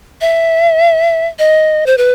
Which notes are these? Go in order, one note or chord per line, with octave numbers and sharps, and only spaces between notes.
E5
D#5
C5
B4